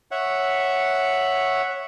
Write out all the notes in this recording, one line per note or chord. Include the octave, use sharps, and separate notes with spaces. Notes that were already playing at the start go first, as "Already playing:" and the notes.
C#5 E5 F#5